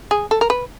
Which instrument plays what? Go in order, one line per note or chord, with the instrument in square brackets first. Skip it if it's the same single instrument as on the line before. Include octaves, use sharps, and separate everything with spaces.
[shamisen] G#4
A4
A#4
B4